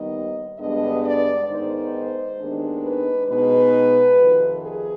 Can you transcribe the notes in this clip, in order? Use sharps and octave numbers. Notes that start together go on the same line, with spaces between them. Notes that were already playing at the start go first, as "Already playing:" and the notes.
Already playing: D#2 D#3 G3 B3 D#4 D#5
G2 D3 G#3 B3 D4 D#5
D5
G#2 D#3 B3 D#4 C5
D#2 D#3 G#3 B3 D4
B4
B2 G#3 B3 D#4 B4
F2 C3 D#3
G#4